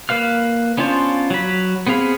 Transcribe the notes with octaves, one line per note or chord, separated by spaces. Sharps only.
A#3 B4 F5 F6
B3 C#4 D4 F4 C5
F#3 B5
B3 C4 G#4 F5 B5